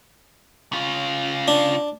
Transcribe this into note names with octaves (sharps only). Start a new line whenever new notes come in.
C#3 F4
D4